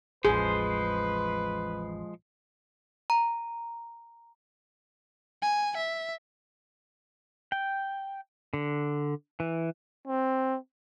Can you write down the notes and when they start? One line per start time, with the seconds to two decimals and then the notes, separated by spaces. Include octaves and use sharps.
0.25 A1 E2 F3 G#3 G#4 B4 C5
3.10 A#5
5.42 G#5
5.77 E5
7.52 G5
8.54 D3
9.40 E3
10.08 C4